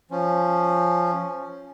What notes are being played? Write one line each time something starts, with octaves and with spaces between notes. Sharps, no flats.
F3 C#4